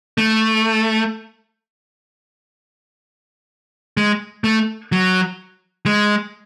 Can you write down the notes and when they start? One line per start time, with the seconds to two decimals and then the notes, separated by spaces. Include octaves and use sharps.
0.18 A3
3.97 G#3
4.44 A3
4.92 F#3
5.86 G#3